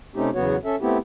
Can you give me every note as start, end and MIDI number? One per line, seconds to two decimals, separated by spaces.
0.15 0.30 48
0.15 0.30 57
0.15 0.30 60
0.15 0.30 61
0.15 0.30 63
0.15 0.30 67
0.35 0.57 40
0.35 0.57 49
0.35 0.57 54
0.35 0.57 59
0.35 0.57 66
0.35 0.57 73
0.64 0.76 61
0.64 0.76 69
0.64 0.76 76
0.81 0.98 57
0.81 0.98 59
0.81 0.98 60
0.81 0.98 64
0.81 0.98 67